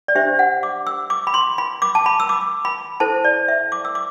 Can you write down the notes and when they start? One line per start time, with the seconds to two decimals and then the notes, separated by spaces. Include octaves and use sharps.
0.08 D5
0.15 D4 G4 C5 E5
0.39 F#5
0.63 D6
0.87 E6
1.10 D6
1.27 B5
1.34 C6
1.58 B5
1.82 D6
1.95 A5
2.06 B5
2.20 E6
2.29 D6
2.65 B5
3.00 E4 A4 C5 A5
3.24 D5
3.48 E5
3.72 D6
3.85 E6
3.95 D6